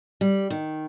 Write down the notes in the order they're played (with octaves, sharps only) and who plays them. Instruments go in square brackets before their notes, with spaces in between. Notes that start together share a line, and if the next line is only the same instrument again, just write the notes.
[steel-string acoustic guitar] G3
D#3